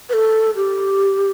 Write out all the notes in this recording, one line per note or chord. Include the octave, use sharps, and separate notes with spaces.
B4
A4
G4